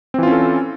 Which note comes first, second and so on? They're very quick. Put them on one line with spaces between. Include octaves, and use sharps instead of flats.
C4 E3 F4 C#4 A4